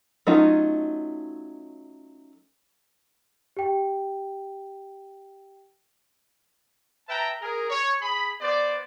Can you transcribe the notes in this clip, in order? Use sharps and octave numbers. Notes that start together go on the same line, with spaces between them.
F#3 A3 C#4 D#4 F4
G4 G5
B4 E5 G5 A5 A#5
G#4 A#4
C#5
G#4 B5
B3 C5 D5